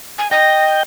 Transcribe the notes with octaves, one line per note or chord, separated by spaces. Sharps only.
G#5
D#5 G5 A#6